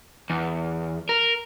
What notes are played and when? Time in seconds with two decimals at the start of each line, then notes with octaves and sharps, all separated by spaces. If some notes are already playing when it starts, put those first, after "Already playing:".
0.30 E2
1.09 A#4